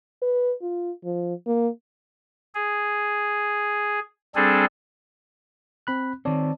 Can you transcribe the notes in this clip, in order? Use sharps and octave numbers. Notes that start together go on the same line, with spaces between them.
B4
F4
F3
A#3
G#4
G3 C4 D4 G#4 A4
C4 B5 F#6
D#3 C4 C#5 D5 A5